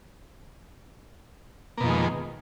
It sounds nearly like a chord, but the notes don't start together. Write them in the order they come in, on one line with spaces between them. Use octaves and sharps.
A#3 B2 F2 D#3 G#3